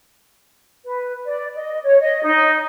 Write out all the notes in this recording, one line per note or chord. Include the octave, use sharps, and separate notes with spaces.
B4
D5
D#5
C#5
D#5
D#4